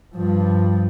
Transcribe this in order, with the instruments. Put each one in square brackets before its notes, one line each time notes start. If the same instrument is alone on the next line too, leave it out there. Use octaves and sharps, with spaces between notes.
[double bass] G2 F3